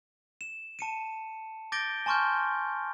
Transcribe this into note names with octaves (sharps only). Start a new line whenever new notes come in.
E7
A5 C#7 D#7
D6 G6 A6 A#6 D7 G7
G#5 A5 C6 C#6 F6 G6